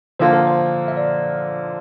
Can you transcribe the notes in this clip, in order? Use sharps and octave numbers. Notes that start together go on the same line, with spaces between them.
D3 F3 A#3 F4 C5
A#4
C5
E5
D5